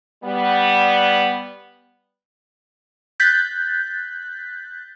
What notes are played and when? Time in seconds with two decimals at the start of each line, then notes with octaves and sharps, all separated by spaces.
0.23 G3 B3
3.20 F#6 G6 A6 B6